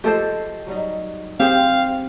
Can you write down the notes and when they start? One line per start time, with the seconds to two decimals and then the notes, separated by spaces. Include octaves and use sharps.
0.04 F3 G#3 A3 G4 A4 C5
0.67 F#3 G3 D#4
1.40 C4 G4 G#4 C5 F5